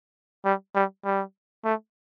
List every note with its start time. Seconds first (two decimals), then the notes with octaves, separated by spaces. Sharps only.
0.45 G3
0.75 G3
1.05 G3
1.65 A3